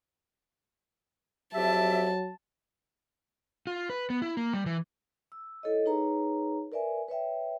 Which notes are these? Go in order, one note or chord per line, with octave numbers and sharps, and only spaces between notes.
F2 F#3 G4 E5 A5
F4
B4
B3
E4
A#3
G3
E3
E6
E4 A4 C#5 D#5
D#4 G#4 B4 C#5 A#5
A#4 B4 D5 E5 G#5
B4 C#5 E5 G5